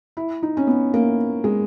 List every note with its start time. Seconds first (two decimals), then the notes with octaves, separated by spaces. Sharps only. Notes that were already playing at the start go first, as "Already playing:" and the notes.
0.17 E4
0.43 D#4
0.57 C#4
0.67 B3
0.94 A#3
1.44 G#3